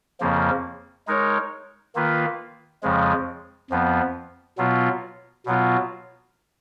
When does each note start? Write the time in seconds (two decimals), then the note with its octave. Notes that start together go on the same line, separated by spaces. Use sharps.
0.20 F2 C#3 F3 A#3
1.07 G#3 D#4 A#4 C#5
1.95 D#3 A#3 F4 B4
2.83 F2 C#3 F3 G#3
3.70 F2 F3 B3
4.58 B2 F#3 B3 F4
5.46 B2 F#3 B3 F4